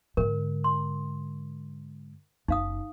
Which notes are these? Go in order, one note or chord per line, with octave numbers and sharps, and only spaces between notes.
G#2 D3 A#4
C6
F#1 D#4 F5 D#6